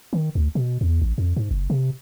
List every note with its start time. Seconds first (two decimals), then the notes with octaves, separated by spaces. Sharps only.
0.13 D#3
0.35 D2
0.55 B2
0.81 E2
1.02 A1
1.18 F2
1.37 G#2
1.51 F#1
1.70 C3